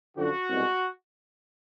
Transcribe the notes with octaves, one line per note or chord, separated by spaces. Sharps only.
F#2 D3 F3 F#4
C2 B2 G#3